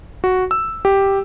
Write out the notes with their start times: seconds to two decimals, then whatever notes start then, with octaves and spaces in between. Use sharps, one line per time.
0.24 F#4
0.51 E6
0.85 G4